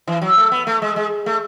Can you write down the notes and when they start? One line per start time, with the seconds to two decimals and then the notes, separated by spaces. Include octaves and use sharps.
0.07 E3
0.22 F#3
0.37 A3
0.52 B3
0.67 A3
0.82 G#3
0.96 G#3
1.26 A3